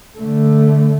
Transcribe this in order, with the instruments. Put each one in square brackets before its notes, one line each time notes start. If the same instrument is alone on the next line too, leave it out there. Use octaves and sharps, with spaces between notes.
[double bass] D3 A3